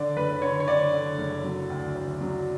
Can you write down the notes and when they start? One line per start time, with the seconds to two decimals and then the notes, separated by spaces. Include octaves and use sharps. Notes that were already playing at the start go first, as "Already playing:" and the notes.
Already playing: D3 D5
0.16 F#1 B4
0.42 D3 C#5
0.60 C#5
0.67 D3 D5
0.93 D3
1.18 F#1
1.44 F#3
1.70 D2
1.95 D2
2.21 F#3